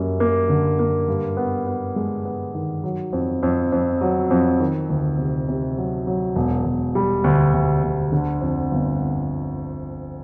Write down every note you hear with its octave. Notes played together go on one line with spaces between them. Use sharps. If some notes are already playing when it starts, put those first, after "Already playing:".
Already playing: F#2 G3 A#3
A#3
D3
A#3
G2
B3
B3
G#3
B3
D#3
F#3
F2
F2
F2
F#3
F2
D#3
D2
C3
C3
F#3
F#3
E1
E1
G3
D2
D2
D2
D3
F2
G1